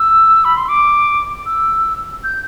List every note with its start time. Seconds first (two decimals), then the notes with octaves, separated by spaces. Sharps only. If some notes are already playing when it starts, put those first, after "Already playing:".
Already playing: E6
0.45 B5
0.57 C6
0.68 D6
1.46 E6
2.24 G6